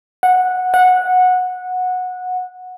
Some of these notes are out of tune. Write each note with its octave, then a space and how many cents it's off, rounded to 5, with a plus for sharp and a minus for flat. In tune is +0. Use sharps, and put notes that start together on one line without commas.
F#5 -10
F#5 -15